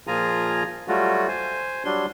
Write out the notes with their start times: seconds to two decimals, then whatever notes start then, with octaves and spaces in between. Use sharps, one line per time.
0.07 A#2 F3 F4 G#4 G#5 A#5
0.88 F#3 G3 A3 F4 F#4
1.28 C5 G#5
1.85 F#3 G3 D4 C6